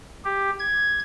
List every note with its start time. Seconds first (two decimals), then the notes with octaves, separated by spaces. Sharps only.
0.25 G4
0.59 G#6